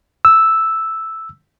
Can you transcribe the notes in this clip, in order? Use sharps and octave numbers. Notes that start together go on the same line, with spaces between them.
E6